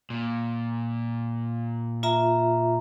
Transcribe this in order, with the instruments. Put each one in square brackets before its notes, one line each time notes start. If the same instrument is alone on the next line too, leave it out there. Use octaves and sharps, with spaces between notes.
[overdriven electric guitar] A#2
[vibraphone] F4 E5 A#5